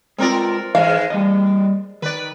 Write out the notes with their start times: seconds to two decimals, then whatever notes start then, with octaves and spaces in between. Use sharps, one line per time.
0.18 G#3 C4 F4 A#4 D5
0.75 G#2 E3 G#3 F5
1.10 E2 G3 D#5
2.02 D#3 B4 D5